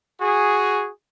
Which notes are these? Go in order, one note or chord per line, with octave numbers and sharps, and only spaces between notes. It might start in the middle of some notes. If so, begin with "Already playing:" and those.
F#4 G#4